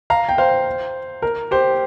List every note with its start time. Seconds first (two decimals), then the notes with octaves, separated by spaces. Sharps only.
0.10 F5 A#5
0.29 G5
0.38 C5 F5
1.22 A#4
1.51 G4 C5